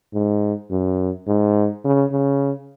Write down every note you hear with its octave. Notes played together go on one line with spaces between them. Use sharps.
G#2
F#2
G#2
C#3
C#3